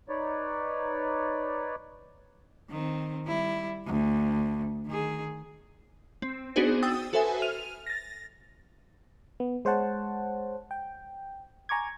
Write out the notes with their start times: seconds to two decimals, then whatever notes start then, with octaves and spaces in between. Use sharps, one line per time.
0.09 D#4 B4 C#5 D5
2.70 D#3 C4
3.27 G3 E4
3.86 D2
4.87 D#3 G#4
6.22 C4
6.56 B3 D4 D#4 F#4 G#4 C5
6.83 G5 D#6 E6 A6
7.13 F#4 A4 B4 C5 E5 G#5
7.42 F6 D#7 F7
7.86 A6 A#6
9.40 B3
9.65 G#3 C5 C#5 F#5 A5
10.71 G5
11.69 G#5 A#5 C#6 D6 G#6